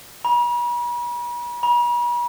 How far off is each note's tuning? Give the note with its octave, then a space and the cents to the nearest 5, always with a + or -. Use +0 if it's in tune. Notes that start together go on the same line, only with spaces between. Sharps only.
B5 -45
B5 -45